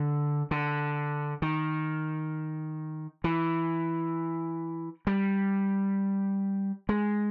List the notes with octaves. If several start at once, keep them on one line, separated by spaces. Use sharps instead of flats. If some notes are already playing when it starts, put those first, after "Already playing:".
Already playing: D3
D3
D#3
E3
G3
G#3